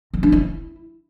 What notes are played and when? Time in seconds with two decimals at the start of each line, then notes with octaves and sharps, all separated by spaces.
0.14 D3
0.23 D4
0.32 E4